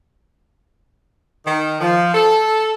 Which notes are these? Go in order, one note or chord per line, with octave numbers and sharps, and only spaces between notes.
D#3
F3
A4